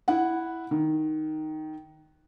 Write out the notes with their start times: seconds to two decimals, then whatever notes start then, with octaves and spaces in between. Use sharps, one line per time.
0.08 E4 F#5
0.71 D#3